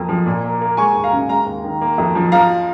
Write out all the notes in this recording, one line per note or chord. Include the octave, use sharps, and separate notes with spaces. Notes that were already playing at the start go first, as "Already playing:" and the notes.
Already playing: F2 A#3
F3
A#2
A#3
A#3
G#3 G#5 C#6
D#2
F5 A#5
C#3
G#3 F5 A#5
D#2
D#3
A#3
F2
F3
F3 F5 A#5